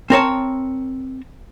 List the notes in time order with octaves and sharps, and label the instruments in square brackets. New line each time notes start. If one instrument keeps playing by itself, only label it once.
[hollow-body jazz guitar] C4 A#4 C#5 A5